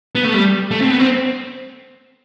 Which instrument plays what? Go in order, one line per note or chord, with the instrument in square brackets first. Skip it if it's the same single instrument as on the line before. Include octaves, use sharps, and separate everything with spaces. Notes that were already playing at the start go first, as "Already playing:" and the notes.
[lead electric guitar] B3
A3
G3
A3
C4
B3
C4